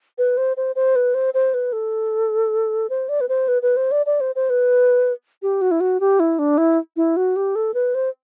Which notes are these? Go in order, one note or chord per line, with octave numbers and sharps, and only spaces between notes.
B4
C5
C5
C5
B4
C5
C5
B4
A4
C5
D5
B4
C5
B4
B4
C5
D5
D5
C5
C5
B4
G4
F#4
E4
F#4
G4
E4
D4
E4
E4
F#4
G4
A4
B4
C5